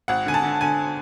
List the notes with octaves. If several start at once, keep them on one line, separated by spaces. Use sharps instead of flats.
G#1 F#5
D3 G#5
A5
D3
D3 G#5